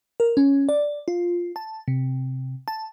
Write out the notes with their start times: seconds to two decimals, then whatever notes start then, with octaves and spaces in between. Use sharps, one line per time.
0.20 A#4
0.37 C#4
0.69 D5
1.08 F4
1.56 A5
1.88 C3
2.68 A5